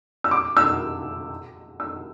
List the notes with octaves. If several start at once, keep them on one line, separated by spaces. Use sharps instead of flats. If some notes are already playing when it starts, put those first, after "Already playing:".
E6
D6
E6
E6